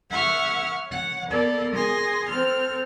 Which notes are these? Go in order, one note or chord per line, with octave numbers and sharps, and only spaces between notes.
E5 F#5 C#6 F6 G#6
C#5 F#5
A#3 B3 A4 A#4 D5
G#4 C6 A#6
C4 A4 F6